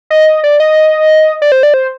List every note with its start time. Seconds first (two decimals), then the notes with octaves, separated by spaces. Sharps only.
0.10 D#5
0.44 D5
0.60 D#5
1.42 D5
1.52 C5
1.63 D5
1.74 C5